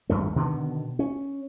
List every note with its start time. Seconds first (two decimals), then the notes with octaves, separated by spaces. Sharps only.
0.09 G#1 E2 G2 A3
0.36 B2 D3 D#3 B3
0.99 C#4